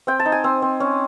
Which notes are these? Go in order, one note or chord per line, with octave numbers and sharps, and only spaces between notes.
C4 G5
A5
D#4
G#5
C4
C4
C#4